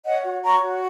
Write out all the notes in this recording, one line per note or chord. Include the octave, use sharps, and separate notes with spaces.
C#5 D#5 F#5
F#4
C#5 A#5 C#6
F#4